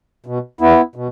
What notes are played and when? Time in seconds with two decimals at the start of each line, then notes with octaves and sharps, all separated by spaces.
0.26 B2
0.61 E2 B3 E4
0.95 B2